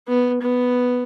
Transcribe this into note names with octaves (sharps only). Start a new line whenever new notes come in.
B3
B3